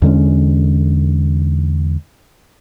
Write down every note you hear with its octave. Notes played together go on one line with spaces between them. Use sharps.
E2 D3 G#3 C#4